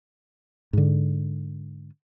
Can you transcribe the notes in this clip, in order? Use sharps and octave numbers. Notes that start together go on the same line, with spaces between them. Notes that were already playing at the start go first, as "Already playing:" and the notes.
G#2 D3